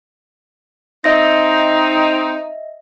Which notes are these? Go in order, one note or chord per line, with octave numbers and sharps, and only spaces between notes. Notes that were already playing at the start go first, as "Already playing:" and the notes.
C4 D#4 D#5 E5 A#6